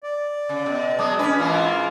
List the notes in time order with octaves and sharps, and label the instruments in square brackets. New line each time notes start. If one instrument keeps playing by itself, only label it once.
[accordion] D5
[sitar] C#3
B2
[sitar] B2 F#3 G#3 [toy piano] A5 D6 D#6
[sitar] C#4 B4 [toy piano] D4
[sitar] G#2 E3 A#3 [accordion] F4 [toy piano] D6